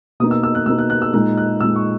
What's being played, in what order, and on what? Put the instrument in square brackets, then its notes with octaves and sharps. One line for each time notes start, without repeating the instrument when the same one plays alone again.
[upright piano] B2 A#3 D#4 D#6
E6
E6
F#6
B2 A#3 D#4 E6
F#6
F#6
E6
A#2 G#3 D#4 F#6
F#6
A#2 E6
G#3 D#4
C#6